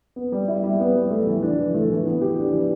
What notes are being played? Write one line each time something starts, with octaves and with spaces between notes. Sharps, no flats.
B3
G3
E4
G3
B3
G3
A3
E3
D4
E3
A3
E3
B3
G4
D4
E3